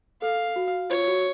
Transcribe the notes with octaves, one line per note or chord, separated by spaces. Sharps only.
A4 F5
F#4
F4 C#5
F#4